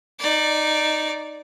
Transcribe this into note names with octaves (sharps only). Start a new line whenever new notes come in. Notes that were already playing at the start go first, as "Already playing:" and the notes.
D#4 D5